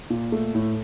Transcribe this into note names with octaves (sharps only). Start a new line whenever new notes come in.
A#2
A3
A2